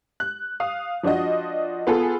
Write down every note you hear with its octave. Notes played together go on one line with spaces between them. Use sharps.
F#6
F5 D#6
F3 D4 F4 F#4 D#5
B3 F4 G#4 A4